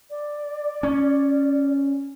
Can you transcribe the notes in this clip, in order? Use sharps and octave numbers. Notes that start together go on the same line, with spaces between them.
D5
C#4